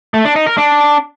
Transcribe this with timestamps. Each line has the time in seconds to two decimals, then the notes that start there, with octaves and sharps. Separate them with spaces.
0.14 A3
0.25 D4
0.36 D#4
0.47 A#4
0.57 D4